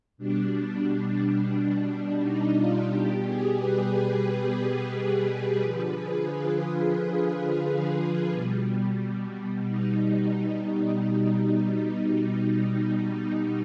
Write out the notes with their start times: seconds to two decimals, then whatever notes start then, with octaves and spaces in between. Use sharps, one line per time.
0.18 B2 G3 D4
2.21 D#4
2.56 F4
2.89 B2 G3 G4
3.24 G#4
3.57 B4
4.92 B4
5.26 B4
5.60 D3 F3 B4
5.94 G#4
6.29 F4
8.31 B2 G3
9.67 D#4
11.03 B2 G3